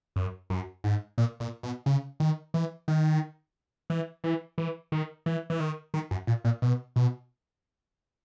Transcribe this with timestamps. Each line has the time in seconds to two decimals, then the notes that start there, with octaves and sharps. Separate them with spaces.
0.16 F#2
0.50 F#2
0.84 G#2
1.18 A#2
1.40 A#2
1.63 B2
1.86 C#3
2.20 D#3
2.54 E3
2.88 D#3
3.90 E3
4.24 E3
4.58 E3
4.92 D#3
5.26 E3
5.50 E3
5.60 D#3
5.94 D#3
6.11 F#2
6.27 A#2
6.44 A#2
6.62 B2
6.96 B2